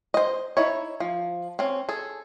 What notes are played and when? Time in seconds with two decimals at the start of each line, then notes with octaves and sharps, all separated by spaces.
0.14 C5 D#5
0.57 D#4 E4 C#5
1.00 F3
1.59 C4 C#4
1.89 G#4 A4